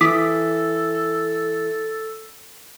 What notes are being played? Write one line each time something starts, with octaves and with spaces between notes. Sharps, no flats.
E3 A4 D6 D#6 B6